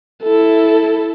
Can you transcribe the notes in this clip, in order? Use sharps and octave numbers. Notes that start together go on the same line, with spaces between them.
E4 A4